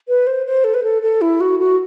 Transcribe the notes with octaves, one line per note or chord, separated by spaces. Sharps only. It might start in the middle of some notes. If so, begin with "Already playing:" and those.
B4
C5
C5
A4
B4
A4
A4
E4
F#4
F#4